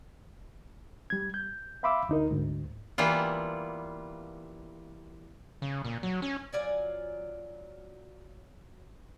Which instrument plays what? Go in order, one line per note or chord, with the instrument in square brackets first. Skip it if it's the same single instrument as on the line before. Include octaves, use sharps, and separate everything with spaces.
[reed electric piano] G3 G#6
G6
E5 F5 B5 C6 D6 E6
D2 D#4 A#4
D2 G#2
[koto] E3 G3 A#3 B3 F4
[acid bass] C#3
A#2
F#3
C#4
[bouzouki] F#3 F4 D5 G#5